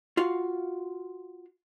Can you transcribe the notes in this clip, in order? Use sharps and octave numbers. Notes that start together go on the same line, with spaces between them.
F4 F#4 F5